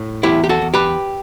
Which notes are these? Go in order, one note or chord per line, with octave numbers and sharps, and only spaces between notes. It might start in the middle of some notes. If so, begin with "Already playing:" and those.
Already playing: A2
E2 E4 G4
G4
F#4 A4
E2
G4 B4